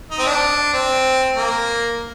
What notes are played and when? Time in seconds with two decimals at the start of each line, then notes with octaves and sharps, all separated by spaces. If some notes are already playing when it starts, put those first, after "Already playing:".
0.11 D#4
0.19 C4
0.26 D4
0.74 C4
1.36 A#3